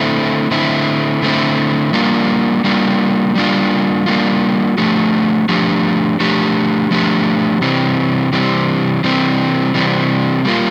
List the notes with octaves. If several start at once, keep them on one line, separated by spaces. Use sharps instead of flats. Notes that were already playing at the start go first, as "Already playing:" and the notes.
Already playing: D3 A3 C4 E4
D3 A3 C4 E4
D3 A3 C4 E4
G3 A#3 D4 F4
G3 A#3 D4 F4
G3 A#3 D4 F4
G3 A#3 D4 F4
F3 A3 D4 G4
F3 A3 D4 G4
F3 A3 D4 G4
F3 A3 D4 G4
C3 E3 G3 C4
C3 E3 G3 C4
C3 E3 G3 C4
C3 E3 G3 C4
G3 A#3 F4